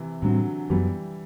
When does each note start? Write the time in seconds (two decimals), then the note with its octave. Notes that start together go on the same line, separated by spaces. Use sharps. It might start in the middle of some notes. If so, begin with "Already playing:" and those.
Already playing: C3 E3
0.22 A2 D3 F#3 G3 C4
0.70 F#2 E3 F#3 G3 B3